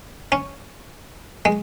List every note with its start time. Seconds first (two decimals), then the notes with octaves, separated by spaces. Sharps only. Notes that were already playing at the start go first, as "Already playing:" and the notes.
0.32 C#4
1.45 G#3